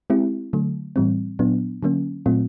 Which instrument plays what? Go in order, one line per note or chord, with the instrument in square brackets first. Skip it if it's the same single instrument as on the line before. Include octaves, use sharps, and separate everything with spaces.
[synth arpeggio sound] G#3 C4 E4 G4
D3 F#3 A3
A2 E3 G3 C4
A#2 F#3 B3 D4
D3 F#3 A#3 C#4
A#2 F#3 A3 C4 F4